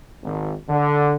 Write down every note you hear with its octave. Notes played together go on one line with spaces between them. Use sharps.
G#1
D3